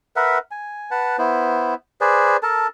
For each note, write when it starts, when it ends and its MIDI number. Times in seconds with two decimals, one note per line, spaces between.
0.16 0.38 70
0.16 0.38 71
0.16 0.38 76
0.16 0.38 78
0.51 0.90 80
0.91 1.17 71
0.91 1.17 78
0.91 1.17 81
1.18 1.74 59
1.18 1.74 64
1.18 1.74 72
2.01 2.37 68
2.01 2.37 71
2.01 2.37 72
2.01 2.37 74
2.43 2.67 69
2.43 2.67 70
2.43 2.67 81